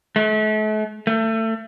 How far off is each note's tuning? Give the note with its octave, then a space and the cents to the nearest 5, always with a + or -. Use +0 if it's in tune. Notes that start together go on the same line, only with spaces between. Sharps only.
A3 -40
A3 +25